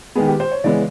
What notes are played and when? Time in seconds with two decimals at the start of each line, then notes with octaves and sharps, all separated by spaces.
0.15 D#3 G#3 B3 G#4
0.27 G4
0.40 C5
0.51 C#5
0.64 C#3 E3 G#3 B3 D5